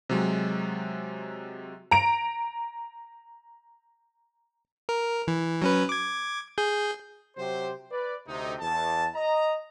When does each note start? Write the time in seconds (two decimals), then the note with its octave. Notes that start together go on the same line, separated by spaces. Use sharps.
0.09 C3 F#3 G#3
1.91 A#5 D7
4.89 A#4
5.28 E3
5.62 F#3 C#4 B4
5.89 D6 G#6
6.58 G#4 G6
7.37 C3 F#3 G4 C5
7.91 B4 D5
8.27 D2 C3 D#4
8.59 E2 A5
9.15 D#5 A#5